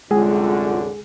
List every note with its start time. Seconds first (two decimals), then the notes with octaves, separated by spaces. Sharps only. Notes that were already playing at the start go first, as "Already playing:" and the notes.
0.11 C2 F#2 D3 G#3 F4 G#4